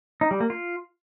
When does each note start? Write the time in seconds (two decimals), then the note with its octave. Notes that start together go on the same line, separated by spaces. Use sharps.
0.21 D#4
0.31 G3
0.40 A#3
0.50 F4